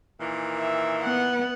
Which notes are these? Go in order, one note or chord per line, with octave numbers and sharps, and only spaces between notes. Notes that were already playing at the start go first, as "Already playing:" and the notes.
A#2 D#3 E3
E5
B3 F#5